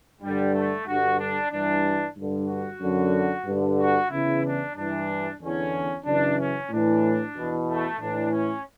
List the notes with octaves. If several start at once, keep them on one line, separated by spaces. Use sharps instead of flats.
G2 D3 G3
A3
G2 D3 F#4
D4
G2 E3 D4
G2 D3
F#4
F#2 D3
G2 D3
F#4
E2 C#3 E3 E4
D4
G2 E3 D4
E2 D3 C#4
F#2 C#3 E3 D4
C#4
A2 E3 D4
E2 B2
A3
A2 E3 D4
C#4